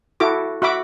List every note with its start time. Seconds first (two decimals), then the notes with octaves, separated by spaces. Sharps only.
0.20 E4 F#4 A4 D6
0.62 F#4 E5 B5 D6